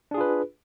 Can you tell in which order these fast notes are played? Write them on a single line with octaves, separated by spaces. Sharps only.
D4 G#4 F4 B4